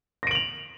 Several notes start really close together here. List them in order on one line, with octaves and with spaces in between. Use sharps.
A#6 D7 F#7 F7